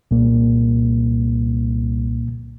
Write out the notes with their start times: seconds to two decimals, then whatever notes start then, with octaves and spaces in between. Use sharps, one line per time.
0.11 C2 A#2 A#3